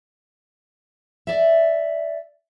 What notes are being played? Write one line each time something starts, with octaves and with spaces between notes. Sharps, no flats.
D5 E5